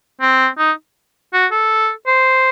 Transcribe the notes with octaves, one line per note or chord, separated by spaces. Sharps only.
C4
D#4
F#4
A4
C5